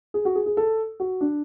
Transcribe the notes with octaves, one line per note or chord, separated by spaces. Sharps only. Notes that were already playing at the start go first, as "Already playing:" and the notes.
G#4
F#4
G#4
G#4
A4
F#4
D4